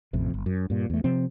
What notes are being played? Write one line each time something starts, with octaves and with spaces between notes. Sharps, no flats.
A1 F2 C3
G1
F#2
G2 A#2
E2 A3
C3 F3 C4